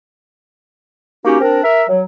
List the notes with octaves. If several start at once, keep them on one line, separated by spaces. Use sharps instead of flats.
A#3 C#4 D#4 F#4 G4
C4 D4 A#4
A#4 E5
F#3